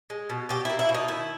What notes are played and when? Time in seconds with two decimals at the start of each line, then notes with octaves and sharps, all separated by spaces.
0.10 G#3
0.30 B2
0.49 B2 G4
0.65 A#3 E4
0.79 E4
0.89 B2
0.94 D#4
1.08 D#3 E4